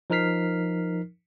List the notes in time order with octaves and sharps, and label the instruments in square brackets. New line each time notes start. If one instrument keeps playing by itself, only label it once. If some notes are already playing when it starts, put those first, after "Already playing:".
[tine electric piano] F3 D#4 A#4 F6 B6 C7